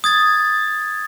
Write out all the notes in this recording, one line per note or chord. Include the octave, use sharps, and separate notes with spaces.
D#6 G#6 A6